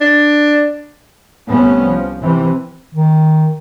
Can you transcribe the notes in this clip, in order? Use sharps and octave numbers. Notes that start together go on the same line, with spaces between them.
D4
C2 A3 B3 C#4
F3
C3 E3
D#3